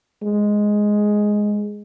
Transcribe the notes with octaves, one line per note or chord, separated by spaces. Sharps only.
G#3